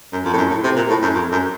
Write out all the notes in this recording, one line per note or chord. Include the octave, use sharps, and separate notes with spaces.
F#2
F2
A2
F#2
A2
C3
A#2
A2
F#2
F2
F#2